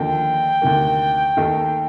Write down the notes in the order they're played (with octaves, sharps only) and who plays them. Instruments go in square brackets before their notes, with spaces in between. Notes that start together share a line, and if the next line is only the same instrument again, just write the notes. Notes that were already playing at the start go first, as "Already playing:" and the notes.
Already playing: [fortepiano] D#2 D3 F3 A#3 [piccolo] G5
[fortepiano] D2 C3 D#3 A#3
D#2 D#3 A3 D#4